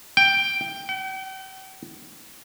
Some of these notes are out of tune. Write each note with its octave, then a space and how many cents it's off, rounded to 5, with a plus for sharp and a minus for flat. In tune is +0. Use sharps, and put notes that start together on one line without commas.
G5 +5
G5 -45